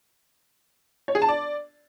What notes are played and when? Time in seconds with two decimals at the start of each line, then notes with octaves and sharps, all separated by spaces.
1.08 C#5
1.15 G#4
1.22 A5
1.29 D5